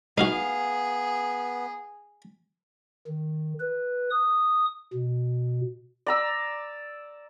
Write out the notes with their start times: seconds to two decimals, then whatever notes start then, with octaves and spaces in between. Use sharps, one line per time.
0.18 B3 D#4 E4 F#4 G#4 F5
3.07 D#3
3.60 B4
4.10 D#6
4.93 B2
6.06 D5 A#5 E6